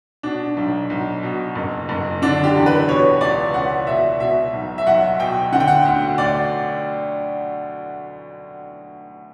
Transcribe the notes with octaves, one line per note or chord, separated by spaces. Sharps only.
B2 D4
B1
B1
B2
F#1
F#1
D3 D4
G4
E2
B4
B2 C#5
C#2 D5
C#2 F#5
B2 E5
B2 E5
B1
E5
B1 F#5
B2 G5
D3 F#5
G5
F#5
D2
D2 D5